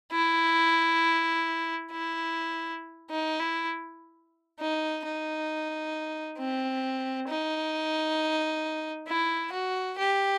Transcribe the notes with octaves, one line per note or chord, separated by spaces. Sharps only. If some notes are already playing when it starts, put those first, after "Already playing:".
E4
E4
D#4
E4
D#4
D#4
C4
D#4
E4
F#4
G4